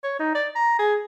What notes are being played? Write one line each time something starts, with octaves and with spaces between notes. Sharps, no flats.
C#5
D#4
D5
A#5
G#4